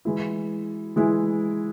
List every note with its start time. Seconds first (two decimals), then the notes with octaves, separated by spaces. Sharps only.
0.05 E3 G#3 E4
0.96 E3 G#3 E4